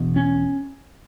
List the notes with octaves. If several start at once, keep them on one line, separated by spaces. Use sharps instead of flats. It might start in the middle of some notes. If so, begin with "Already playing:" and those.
Already playing: E1 E2 B2
C#4